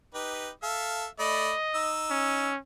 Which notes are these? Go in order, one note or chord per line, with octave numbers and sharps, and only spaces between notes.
D#4 G4 B4
A4 E5 F5
A3 D5 D#5 B5
D#4 E6
C#4